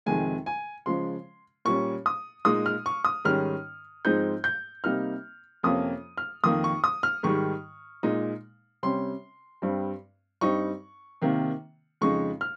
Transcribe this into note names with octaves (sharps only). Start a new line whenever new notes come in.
F2 C3 D#3 G#3 G#5
G#5
C#3 F3 G#3 C6
A#2 G3 C#4 C#6
D#6
A#2 G#3 D#4 D#6
F6
C#6
D#6
G#2 D#3 G3 C#4 F6
G#2 F3 G#3 C4 D#4 G6
G6
C3 G3 A#3 D#4 F6
F2 C3 F3 A#3 C#4 D#6
F6
F2 D#3 A#3 D#6
C#6
D#6
F6
G#2 D#3 G3 C#6
A#2 G#3 D#4
C3 G3 C#4 C6
G2 G3 C4
G2 G3 C4 D#4 C#6
C3 D#3 A#3
F2 C#3 G#3 D#4 C#6
F6